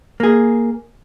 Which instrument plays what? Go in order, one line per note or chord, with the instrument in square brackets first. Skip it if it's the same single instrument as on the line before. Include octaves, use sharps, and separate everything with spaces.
[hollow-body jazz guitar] A#3 G#4